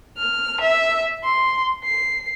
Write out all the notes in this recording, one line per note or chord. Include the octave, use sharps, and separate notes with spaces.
F6
E5
C6
C7